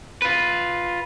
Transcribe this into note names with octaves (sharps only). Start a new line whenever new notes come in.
F4 B4